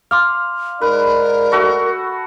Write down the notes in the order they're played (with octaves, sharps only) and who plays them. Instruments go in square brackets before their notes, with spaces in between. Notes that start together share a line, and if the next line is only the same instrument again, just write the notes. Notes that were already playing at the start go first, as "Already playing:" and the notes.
[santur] F5 [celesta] C6 D6 F6
[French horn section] G#2 D#4 D5 [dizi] A#4 [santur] B4
[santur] A3 F#4